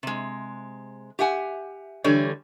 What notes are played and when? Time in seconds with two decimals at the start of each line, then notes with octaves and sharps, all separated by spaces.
0.03 C3 G#3
1.19 G4 E5 F#5 G#5
2.04 D3 E3 G3 A3 C#5